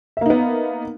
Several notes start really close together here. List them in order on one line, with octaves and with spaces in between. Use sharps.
E5 A#3 D#4 B3